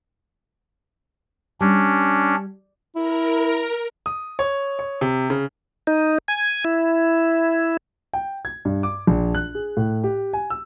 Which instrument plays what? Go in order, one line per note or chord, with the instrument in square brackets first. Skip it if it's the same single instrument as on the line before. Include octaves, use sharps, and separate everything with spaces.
[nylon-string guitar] G3 [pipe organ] C#4 D4
[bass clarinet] E4 [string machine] A#4
[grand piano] D#6
C#5
C#5
C3
C#3
[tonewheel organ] D#4
G#5
E4
[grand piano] G5
G#6
G2
D6
A#1
F#6
G#4
A2
G4
G#5
E6